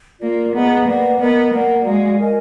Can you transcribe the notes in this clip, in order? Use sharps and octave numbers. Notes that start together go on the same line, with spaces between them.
A#3 F4 A#4 D5
B3 G#4 D#5 F#5 A#5
A#3 B4 D5 F#5
B3 A#4 D#5 A#5
A#3 A#4 D5 F#5 A#5
G#3 F#4 D5 F5
A#4 D#5 G#5